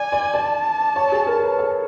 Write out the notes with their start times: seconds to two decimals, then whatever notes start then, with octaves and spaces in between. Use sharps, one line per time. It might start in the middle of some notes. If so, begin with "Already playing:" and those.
Already playing: D5 G#5
0.12 D5
0.33 D5 A5
0.96 C#5
1.12 G#4
1.27 A#4
1.43 B4
1.58 A4